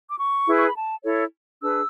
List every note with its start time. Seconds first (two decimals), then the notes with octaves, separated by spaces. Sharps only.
0.10 D6
0.18 C#6
0.46 E4 G#4 B4
0.56 C#6
0.65 B5
0.75 A5
1.04 E4 A4 C#5
1.61 D4 G#4 B4 E6